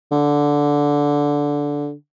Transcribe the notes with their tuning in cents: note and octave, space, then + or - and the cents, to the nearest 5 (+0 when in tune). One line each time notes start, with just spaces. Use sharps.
D3 -10